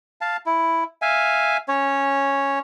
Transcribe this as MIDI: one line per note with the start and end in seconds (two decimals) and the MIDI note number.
0.21 0.37 77
0.21 0.37 81
0.46 0.84 64
1.02 1.57 76
1.02 1.57 77
1.02 1.57 80
1.68 2.59 61
1.68 2.59 73